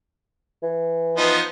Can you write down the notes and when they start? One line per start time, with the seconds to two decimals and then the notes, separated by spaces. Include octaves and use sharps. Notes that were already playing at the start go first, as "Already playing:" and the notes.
0.63 E3
1.17 F3 B3 D#4